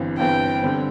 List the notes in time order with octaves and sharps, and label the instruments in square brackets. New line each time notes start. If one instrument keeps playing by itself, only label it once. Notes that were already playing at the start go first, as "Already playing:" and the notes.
Already playing: [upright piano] G1 G2 E3 C4
[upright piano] G1 G2 E3 C4 [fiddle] G5
[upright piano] D3 G3 C4